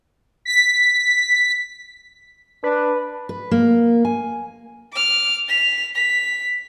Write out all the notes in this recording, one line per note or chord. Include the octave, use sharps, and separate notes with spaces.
B6
D4 B4
B4
A#3
G#5
D6 F6
B6 F7
B6